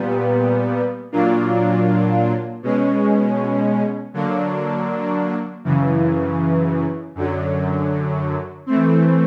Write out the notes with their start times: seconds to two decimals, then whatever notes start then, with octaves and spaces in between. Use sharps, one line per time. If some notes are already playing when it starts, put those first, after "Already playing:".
Already playing: A#2 G3 B3
1.12 A#2 F#3 A#3 D4 F4
2.62 B2 G#3 C#4
4.14 D3 F#3 A#3 D4
5.64 F#2 C#3 E3
7.15 F#2 D3 F#3
8.66 E3 A3 C4